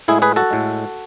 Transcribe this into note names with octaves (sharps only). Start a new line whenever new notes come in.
A2 G#3 E4 G#4
G#4 B4
F#4 A4
A2 G#3